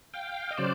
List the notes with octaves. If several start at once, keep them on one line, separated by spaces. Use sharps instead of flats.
F5 G5
D#5
C#3 F#3 C5 D5